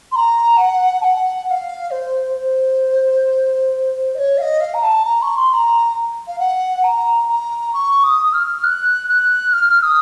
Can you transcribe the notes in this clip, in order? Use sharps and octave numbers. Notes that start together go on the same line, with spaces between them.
C6
A#5
F#5
A5
F#5
F#5
F5
C5
C5
D#5
C#5
F5
D#5
F5
A#5
A5
A#5
C#6
C6
C6
A#5
F5
F#5
A#5
A#5
C#6
D#6
F6
F#6
F#6
F6
D#6